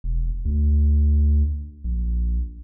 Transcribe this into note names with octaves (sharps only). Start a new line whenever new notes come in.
E1
D2
A#1